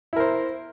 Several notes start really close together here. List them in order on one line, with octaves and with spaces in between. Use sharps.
E4 A#4 C5